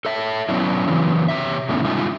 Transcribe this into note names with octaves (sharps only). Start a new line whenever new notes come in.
A4 C#5 E5
F#3 B3 C#4 D4 E4
C#3 E3 F#3 C4
C3 C#5 E5
G#2 D#3 A3 B3 C#4 E4
G3 G#3 D#4 F4 E5